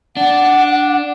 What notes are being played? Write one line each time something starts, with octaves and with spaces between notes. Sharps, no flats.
D4 F#5